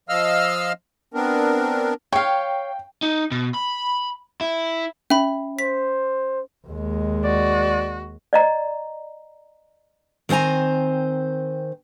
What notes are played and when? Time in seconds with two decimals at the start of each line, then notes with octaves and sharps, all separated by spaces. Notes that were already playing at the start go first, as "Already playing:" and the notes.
0.09 F3 D#5 F5 E6 F6
1.14 B3 C4 D4 A#4
2.12 C#5 F5 G5
3.03 D#4
3.32 B2
3.54 B5
4.41 E4
5.10 C#4 E5 B5
5.59 C5 B6
6.68 D#2 G#3
7.24 F#4 D5
8.33 D5 D#5 A#5
10.29 D#3 C4 C5 G#5 A#5